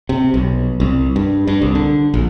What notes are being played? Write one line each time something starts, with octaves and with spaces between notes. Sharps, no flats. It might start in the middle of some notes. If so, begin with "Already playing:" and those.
C3
B1
C2
G2
G2
C2
D3
A#1